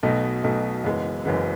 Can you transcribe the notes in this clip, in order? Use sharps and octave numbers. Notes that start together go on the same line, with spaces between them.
B1 B2 A3 D#4
B1 B2 A3 D#4
F#1 F#2 E3 G#3 B3
F#1 F#2 E3 G#3 B3